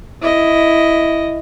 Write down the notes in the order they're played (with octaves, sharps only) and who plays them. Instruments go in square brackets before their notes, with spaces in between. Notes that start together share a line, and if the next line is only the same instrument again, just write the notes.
[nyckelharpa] E4 D#5